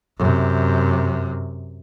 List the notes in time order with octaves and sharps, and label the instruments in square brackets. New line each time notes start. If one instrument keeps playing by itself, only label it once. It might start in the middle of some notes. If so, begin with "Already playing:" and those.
[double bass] F#2 C3